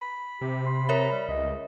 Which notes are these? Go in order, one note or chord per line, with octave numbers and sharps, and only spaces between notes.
B5
C3 G4
C6
A#4 C#5 E5 A#5
G3
C#2 D#5